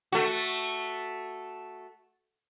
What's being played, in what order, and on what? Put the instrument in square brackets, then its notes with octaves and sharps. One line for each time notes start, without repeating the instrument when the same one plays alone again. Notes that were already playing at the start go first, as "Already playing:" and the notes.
[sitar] A3 F#4